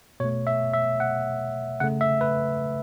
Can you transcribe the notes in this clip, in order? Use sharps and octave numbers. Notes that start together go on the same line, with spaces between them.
B2 A3 C#5
E5
E5
F#5
C#3 A3 F#5
E5
B4